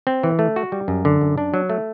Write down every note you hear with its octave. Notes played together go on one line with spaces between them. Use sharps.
C4
E3
A3
F#4
G3
F#2
D3
F#2
D4
F#3
A3